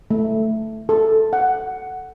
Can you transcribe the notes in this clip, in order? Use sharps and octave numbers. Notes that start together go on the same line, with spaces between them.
A3
A4
F#5